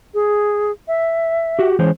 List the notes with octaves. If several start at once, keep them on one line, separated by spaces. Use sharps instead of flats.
G#4
E5
F#4 G4
E3 G#3 C#4 C5